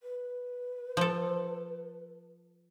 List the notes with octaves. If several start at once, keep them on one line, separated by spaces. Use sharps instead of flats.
B4
F3 A4